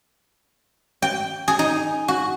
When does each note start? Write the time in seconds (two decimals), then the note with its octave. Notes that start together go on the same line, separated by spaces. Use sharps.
1.02 G5
1.48 G#4
1.59 D#4
2.08 F#4